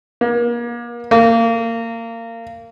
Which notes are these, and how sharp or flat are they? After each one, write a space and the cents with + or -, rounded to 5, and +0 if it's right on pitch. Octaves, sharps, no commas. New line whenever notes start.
A#3 +35
A#3 -25